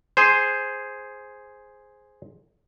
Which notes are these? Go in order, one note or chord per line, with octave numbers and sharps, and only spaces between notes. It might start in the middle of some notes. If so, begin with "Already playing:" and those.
G#4 C5